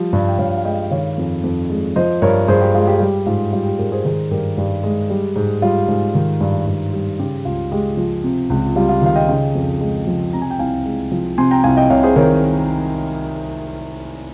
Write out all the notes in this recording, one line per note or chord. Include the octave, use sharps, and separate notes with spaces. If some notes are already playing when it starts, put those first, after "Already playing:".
Already playing: F3 G3
G2
G5
G2 C#5 F5
F5
G#3 D#5 G5
D#3 C#5 F5
F2
F2
G#3
F3 C5 D#5
G2 A#4 C#5
G2 G#4 C5
G4
G#3 F4 G#4
G4
G3 G4
G#2 F4
G3 F4
G4
G#2 G4 A#4
G#4 C5
D#3 G#4 C5
G2 G4 A#4
G2 G4
G#3
G3
G#2
G3 F4
G#2
D#3
G2
G2
G3
C#3 G4
C#2 F4
G#3 G4
F3
C3
C#2
G3 F4
F4
D#3 F5
D#5 G5
C#3
F2
G#3
F3
C3 A#5
G#5
G5
C2 F5 G#5
G#3
F3
C3 G#5 C6
G5 A#5
C2 F5 G#5
D#5 G5
C2 C#5 F5
G#4 C5
D#3 A#4 C#5